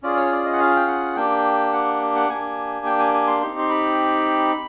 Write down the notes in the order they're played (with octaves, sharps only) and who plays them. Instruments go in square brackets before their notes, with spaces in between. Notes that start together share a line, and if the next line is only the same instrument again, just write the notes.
[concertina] C#4 F4 G#4 D5
C#5
D5
D#5
F#5
F5
G5
F#5
A#3 D4 G4 G5
F#5
F#5
A#3 D4 G4 G#5
G5
G#5
G#5
C6
C4 D#4 G4 C6
C6
B5